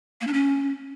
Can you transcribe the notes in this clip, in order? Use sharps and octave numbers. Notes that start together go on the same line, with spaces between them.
A#3
D4
C#4